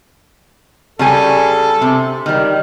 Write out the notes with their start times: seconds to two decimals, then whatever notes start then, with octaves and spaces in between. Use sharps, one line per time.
0.99 C#3 G3 A4 G#5
1.81 C3
2.26 D#3 G3